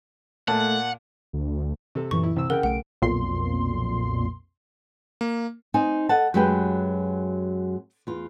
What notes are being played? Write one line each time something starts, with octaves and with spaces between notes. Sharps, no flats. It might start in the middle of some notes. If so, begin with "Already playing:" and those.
A#2 A3 F#5 A5
D2
C3 A4
F#2 A#2 E3 C#6
E4
C2 C4 E6
C#3 A#4 F#5 G5
B1 A3 F#5 D7
B1 F2 A#2 C6
A#3
C4 D#4 G#5
A4 D#5 F#5 A5
F#2 F#3 G#3 G4 B4 G5
E2 F4